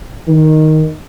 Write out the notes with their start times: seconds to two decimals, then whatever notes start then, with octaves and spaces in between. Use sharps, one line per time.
0.27 D#3